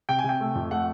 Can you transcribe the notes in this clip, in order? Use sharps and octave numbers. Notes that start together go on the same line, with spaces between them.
C3 G5
G#5
C3 G5
A3
F2
A3 F#5